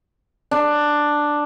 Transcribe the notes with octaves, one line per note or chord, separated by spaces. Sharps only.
D4